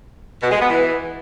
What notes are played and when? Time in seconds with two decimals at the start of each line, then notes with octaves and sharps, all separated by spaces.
0.41 B2
0.51 G#3
0.60 B3
0.69 E3